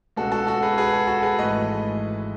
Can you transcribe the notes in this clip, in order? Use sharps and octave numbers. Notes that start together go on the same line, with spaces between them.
C#2 B2 G#3 F#4 A4
F#4 A4
F#4 A4
G#4 B4
G#4 B4
F#4 A4
F#4 A4
G#4 B4
G#1 G#2 E3 A3 B4 D#5